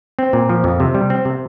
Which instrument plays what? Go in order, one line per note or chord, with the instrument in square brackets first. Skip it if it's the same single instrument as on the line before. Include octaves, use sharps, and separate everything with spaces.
[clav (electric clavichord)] C4
A#2
F3
F2
C3
G3
C4
C3